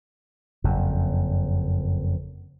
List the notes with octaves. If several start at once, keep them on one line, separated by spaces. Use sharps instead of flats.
F#1 F2